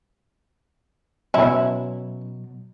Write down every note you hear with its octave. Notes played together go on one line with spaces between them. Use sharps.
B2 F#3 C#4 E4